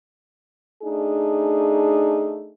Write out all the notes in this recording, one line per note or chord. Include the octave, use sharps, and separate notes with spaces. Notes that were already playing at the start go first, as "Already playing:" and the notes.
A3 D4 D#4 G#4